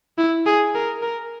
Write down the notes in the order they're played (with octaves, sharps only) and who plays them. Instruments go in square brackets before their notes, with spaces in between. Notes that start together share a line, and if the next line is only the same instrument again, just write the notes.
[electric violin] E4
G#4
A#4
A#4